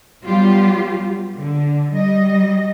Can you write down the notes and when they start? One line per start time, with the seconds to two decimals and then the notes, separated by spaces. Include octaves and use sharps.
0.24 F#3 G3 B3 F4 G4
1.37 D3
1.92 G3 D#5